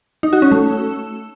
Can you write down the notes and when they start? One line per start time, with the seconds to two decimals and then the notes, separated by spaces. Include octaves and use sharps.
0.23 D#4
0.33 F#4
0.42 C#4
0.52 A3